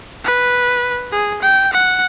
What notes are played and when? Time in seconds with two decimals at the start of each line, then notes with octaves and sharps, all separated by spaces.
0.24 B4
1.12 G#4
1.42 G5
1.73 F#5